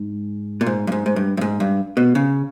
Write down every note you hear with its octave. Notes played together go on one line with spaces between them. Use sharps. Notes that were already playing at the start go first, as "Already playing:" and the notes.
Already playing: G#2
A#2
G#2
G2
G#2
G#2
G2
G2
G#2
G2
B2
C#3